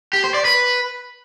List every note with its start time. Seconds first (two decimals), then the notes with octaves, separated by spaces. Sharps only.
0.13 G4
0.24 C5
0.34 D5
0.45 B4